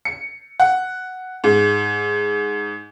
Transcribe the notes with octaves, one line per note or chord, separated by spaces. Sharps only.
C#7
F#5
G#2